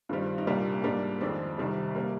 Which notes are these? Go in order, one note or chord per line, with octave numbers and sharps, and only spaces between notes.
G2 D#3 G3 C4 F4
D#4
C2 A#2 G3 A#3 D4
G#2 G3 A#3 D4
F2 D#3 G#3 C4 D4
C2 C3 D#3 G3
C3 G3 A#3